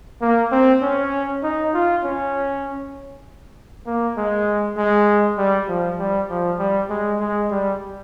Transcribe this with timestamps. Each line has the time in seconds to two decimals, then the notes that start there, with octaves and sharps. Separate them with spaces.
0.22 A#3
0.52 C4
0.82 C#4
1.43 D#4
1.74 F4
2.04 C#4
3.86 A#3
4.17 G#3
4.77 G#3
5.38 G3
5.68 F3
5.99 G3
6.30 F3
6.59 G3
6.90 G#3
7.20 G#3
7.51 G3